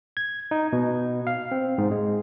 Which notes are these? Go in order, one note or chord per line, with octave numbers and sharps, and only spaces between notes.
G#6
D#4
B2
F5
C4
G#2
G#3